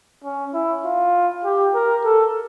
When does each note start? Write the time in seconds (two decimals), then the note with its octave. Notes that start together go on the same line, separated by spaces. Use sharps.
0.24 C#4
0.54 E4
0.84 F4
1.44 G4
1.74 A#4
2.04 A4